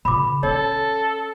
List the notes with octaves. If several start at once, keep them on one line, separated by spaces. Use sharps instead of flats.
A#2 C#3 B5 D6
C#4 A4 C#5